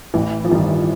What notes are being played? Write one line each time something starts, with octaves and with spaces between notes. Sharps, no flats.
A1 E3
F3
G2 D#3 E3